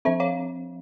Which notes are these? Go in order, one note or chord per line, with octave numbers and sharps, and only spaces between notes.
F3 C4 C5 E5
C#5 F5